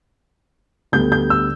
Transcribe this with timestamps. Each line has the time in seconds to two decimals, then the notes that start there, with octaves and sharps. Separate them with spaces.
0.92 D2 D3 G3 B3 G6
1.12 G6
1.30 E6